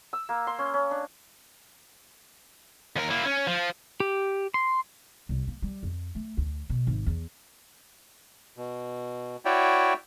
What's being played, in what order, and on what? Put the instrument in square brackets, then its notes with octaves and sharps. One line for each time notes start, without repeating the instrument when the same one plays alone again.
[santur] E6
A#3
C6
C#4
C#4
D4
[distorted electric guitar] D#2 A#4
A#3 E4
C#4
F3
[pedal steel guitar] G4
C6
[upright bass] C2
A#3
G3
F2
A3
D2
B2
G#1
E2
[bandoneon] B2
E4 F#4 C#5 D5 E5 G5